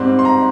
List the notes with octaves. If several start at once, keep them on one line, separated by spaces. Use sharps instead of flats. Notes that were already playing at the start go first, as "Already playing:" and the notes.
Already playing: G#2 G3 C4 C6
C6
A#5